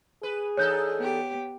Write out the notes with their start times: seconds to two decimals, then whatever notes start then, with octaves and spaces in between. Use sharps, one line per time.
0.23 G#4 B4
0.57 E2 D#4 A4 C#5 F#6 G6
0.96 B3 G4